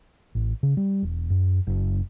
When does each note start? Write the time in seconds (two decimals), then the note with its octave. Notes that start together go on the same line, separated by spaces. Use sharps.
0.35 A1
0.63 C#3
0.77 G3
1.02 E1
1.30 F#2
1.67 F#1